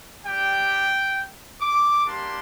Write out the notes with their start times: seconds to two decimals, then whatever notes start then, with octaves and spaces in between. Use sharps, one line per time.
0.25 G3 D4 G4 G5
1.60 D6
2.06 G3 A#3 D4 G4 C6